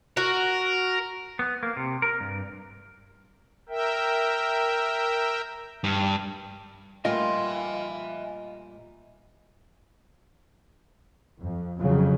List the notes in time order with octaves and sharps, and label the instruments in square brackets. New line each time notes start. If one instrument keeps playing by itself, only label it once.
[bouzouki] F#4 [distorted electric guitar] A#4
[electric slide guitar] B3
A#3
C3
A#4
G2
[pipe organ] A#4 E5 G5
[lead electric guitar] G2
[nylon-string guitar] A#2 G3 A3 [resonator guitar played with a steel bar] F4 [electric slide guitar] D#5 [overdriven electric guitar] E5 G#5
[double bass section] F2
F2 C#3 F#3